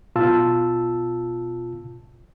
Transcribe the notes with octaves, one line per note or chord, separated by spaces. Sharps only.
B2 F4 A5 E6